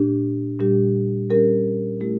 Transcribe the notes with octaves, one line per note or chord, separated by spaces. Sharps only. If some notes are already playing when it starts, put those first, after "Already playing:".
Already playing: A#2 A3 D4 G4
A#2 G3 D4 G4
G3 C#4 G4 A#4
A3 E4 G4 A#4